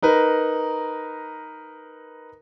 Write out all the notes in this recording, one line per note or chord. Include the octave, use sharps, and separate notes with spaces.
D#4 A#4 B4